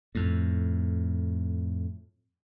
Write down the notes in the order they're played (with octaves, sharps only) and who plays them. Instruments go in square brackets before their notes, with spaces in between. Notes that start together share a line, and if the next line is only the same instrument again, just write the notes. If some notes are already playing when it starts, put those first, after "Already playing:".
[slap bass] F2 A2